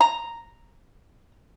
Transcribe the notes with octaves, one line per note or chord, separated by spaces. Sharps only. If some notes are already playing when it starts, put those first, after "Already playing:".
A#5